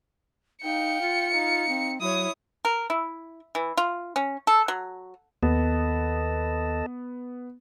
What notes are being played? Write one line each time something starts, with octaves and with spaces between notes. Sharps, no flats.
D#4 F5 G5 C#7
F4
D#4 F5
C4
F#3 E4 C#5 D#6
A#4
E4
E3
F4
C#4
A4
F#3
D#2 B3 A4 D#5 A5